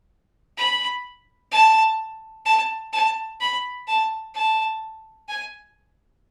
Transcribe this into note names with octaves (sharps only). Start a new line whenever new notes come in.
B5
A5
A5
A5
B5
A5
A5
G#5